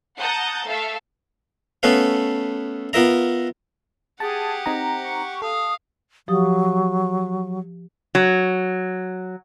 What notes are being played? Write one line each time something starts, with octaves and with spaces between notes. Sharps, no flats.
F#5 A5 A#5 D#6 G6 A6
A3 A4 E5 F5
A3 B3 C#4 A4 B4 F5
B3 F4 A#4 E5 A#5
G4 G#4 F#5 A5
C4 D#4 A#5
C#6
A4 F5 D#6
F3 F#3 G4 D#6
F#3